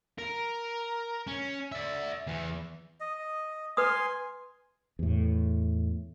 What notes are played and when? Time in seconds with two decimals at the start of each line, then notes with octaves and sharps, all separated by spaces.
0.18 A#4
1.27 C#4
1.72 D5 E5
2.27 E2 E3
3.00 D#5
3.77 B4 G#5 C6 D#6
4.99 E2 A2